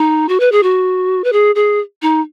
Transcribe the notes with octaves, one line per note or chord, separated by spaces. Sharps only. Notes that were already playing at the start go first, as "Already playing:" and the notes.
Already playing: D#4
F#4
B4
G#4
F#4
B4
G#4
G#4
D#4